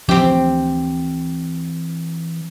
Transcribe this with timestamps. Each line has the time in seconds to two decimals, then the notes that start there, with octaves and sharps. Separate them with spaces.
0.09 D2 E3 F3 C4 C#4 G4